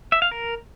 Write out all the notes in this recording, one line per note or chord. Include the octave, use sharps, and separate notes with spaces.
E5
F5
A#4